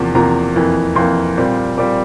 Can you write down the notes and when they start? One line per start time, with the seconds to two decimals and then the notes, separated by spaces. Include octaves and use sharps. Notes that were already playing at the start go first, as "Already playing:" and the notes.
Already playing: E2 C3 F3 A#3
0.15 E2 C3 F3 A#3 A#5
0.56 F2 E3 A#3
0.96 F2 E3 A#3 C6
1.37 A#2 G3 C4
1.78 A#2 G3 C4 D6